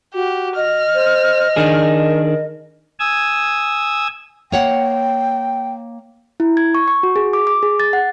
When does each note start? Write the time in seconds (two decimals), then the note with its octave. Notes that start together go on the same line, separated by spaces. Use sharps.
0.14 F#4 G4
0.56 D#5 F6
0.95 C5
1.56 D#3 D4 G#4 A#4
3.00 G#5 D#6 E6 G#6
4.52 A#3 C#5 F#5 G5
6.40 E4
6.57 G#6
6.75 C#6
6.88 C#6
7.03 F#4
7.16 G#4
7.33 D6
7.47 D6
7.63 G#4
7.80 A6
7.93 F#5